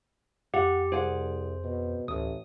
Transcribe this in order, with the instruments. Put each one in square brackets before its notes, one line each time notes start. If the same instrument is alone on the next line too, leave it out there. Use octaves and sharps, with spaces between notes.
[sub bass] F2 [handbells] G4 [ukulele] F#5
[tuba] C2 [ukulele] G#4 F#5 [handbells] C5
[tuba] B2
[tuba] A1 [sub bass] D2 [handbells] D#6